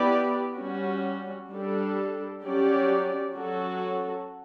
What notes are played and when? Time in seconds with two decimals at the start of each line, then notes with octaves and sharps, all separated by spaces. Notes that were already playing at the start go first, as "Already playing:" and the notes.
Already playing: B3 E4 G4 B4 D5
0.56 G3 C#4 F#4
1.48 G3 D4 A4
2.42 F#3 C#4 G4 D5
3.35 F#3 C#4 F#4 A4